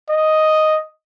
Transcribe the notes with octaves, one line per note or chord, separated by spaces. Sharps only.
D#5